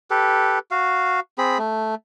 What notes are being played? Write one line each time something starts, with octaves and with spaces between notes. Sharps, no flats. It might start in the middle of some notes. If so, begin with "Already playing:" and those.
G4 A4 B4
F#4 F5
C4 G#4 B5
A3